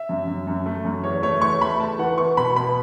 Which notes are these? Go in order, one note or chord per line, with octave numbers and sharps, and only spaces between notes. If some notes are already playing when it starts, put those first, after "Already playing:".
Already playing: E5
F#2
F#2
F#2
A3
F#2
E2 C#5
A3 C#5
E2 C#6
A3 B5
A3 A5
E3 F#5
B3 C#6
B2 B5
B3 B5